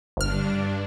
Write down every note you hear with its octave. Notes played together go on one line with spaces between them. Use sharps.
G1 G2 D4 F6